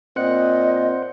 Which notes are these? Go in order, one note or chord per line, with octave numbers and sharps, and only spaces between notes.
A#2 C4 C5 D#5 F#5 F#6 C#7